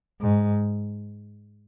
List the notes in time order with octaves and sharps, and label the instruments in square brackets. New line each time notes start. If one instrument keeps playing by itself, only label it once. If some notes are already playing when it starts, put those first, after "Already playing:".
[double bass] G#2